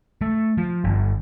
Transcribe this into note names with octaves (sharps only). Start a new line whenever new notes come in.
A3
F3
G1